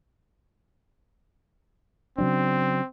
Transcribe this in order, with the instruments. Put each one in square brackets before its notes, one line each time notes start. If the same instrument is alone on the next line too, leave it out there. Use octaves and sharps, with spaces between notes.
[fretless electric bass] C#3 F#3 D4 [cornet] C4